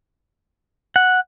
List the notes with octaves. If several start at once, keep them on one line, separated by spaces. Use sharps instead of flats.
F#5